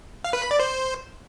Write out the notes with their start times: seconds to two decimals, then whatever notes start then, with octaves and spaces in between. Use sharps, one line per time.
0.24 F5
0.33 B4
0.42 B5
0.51 D5
0.60 C5